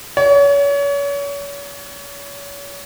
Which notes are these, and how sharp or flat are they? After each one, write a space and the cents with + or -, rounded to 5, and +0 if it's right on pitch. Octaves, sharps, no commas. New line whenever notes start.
C#5 +35